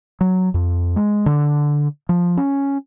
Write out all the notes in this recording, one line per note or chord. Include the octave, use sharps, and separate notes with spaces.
F#3
F2
G#3
D3
F3
C#4